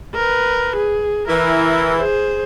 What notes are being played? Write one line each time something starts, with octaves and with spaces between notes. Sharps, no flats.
A#4 B4
G#4
E3 E4 A#4
G#4 C5